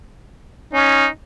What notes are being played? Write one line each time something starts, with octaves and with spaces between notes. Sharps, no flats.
C#4 D#4